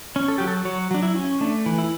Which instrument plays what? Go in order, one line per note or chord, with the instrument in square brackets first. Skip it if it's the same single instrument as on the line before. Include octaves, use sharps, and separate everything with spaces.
[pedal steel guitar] C#4
A4
F#3 G4
A4
F#3 C#5
F#3 D4
E4
C#4
A3 D4
E3
E4